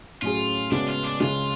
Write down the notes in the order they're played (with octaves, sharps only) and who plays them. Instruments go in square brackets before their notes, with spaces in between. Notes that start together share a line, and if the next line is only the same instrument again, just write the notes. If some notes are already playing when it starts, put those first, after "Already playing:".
[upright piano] A2 F#3 C#4 G#4 [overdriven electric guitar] F4
[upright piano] C#3 G#3 B3 F#4 [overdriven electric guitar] D4
[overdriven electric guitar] F4
D4
[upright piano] C#2 C#3 G#3 [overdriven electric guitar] F4